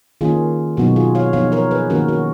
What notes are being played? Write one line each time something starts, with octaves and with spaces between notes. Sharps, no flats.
D#3 A#3 C#4 F4 G#4
B2 F#3 B3 D#4 F#4
F4 G#4
C#5 F5
F3 B3 D#4 C#5 F5
A#4 C#5
G#4 B4
D#3 A#3 C#4 F#4 A#4
F#4